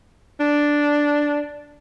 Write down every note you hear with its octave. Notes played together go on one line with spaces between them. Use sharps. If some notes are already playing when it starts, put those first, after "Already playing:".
D4